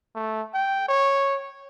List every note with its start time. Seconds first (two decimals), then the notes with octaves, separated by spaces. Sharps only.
0.16 A3
0.54 G5
0.89 C#5